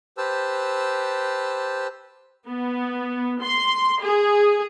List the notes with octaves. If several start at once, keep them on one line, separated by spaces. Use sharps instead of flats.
G4 B4 C5 A5 E6
B3
C6
G#4